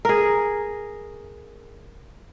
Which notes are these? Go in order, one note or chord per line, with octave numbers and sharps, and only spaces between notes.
G#4 A#4